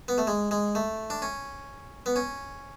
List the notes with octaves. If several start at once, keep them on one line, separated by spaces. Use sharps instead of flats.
B3
A3
G#3
G#3
A3
D4
C#4
B3
C#4